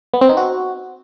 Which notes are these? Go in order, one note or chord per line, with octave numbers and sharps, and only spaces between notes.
B3
C4
D#4
F#4